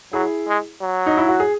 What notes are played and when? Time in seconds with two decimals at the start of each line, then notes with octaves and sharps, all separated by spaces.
0.13 F#3 E4 G#4
0.47 G#3
0.81 F#3
1.06 D#4
1.17 E4
1.28 F#4
1.40 G#4